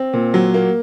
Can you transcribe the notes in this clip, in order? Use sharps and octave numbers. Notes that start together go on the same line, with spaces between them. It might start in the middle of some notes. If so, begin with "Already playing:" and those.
Already playing: C4
A#2
F#3
A#3